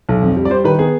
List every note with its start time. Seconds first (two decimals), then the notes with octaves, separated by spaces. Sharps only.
0.09 B1
0.22 F2
0.37 G3
0.45 D5
0.50 G3 C5
0.64 D#3 B4
0.79 B3 G#4